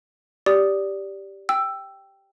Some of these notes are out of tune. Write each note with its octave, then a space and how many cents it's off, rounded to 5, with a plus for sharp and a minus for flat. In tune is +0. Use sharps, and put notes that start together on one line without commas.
G4 +0 D5 -10 D#6 +0
G5 +0 E6 +10